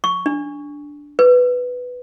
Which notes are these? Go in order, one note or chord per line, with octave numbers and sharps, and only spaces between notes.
C#6
D4
B4